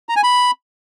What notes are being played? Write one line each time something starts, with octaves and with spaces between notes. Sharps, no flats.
A#5
G#5
B5